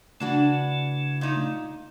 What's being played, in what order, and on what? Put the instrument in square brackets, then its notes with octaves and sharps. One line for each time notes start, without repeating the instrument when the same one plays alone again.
[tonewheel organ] C#3 A3 [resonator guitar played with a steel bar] E3 D4 F#4
[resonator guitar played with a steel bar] A#2 D#4